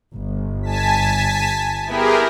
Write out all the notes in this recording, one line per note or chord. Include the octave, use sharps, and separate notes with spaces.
G1
G#5 A5 B6
B3 E4 G4 G#4 A#4